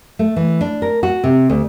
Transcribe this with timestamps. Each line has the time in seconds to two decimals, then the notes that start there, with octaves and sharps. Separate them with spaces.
0.19 A3
0.36 E3
0.61 D4
0.82 A#4
1.03 F#4
1.24 C3
1.50 D2